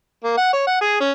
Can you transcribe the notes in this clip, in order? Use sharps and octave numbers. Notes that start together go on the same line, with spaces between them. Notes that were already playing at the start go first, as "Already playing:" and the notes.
A#3
F#5
C#5
F#5
G#4
C#4